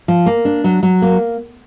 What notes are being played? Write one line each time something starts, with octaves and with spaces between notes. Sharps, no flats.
F3
A#3
D4
F#3
F#3
A#3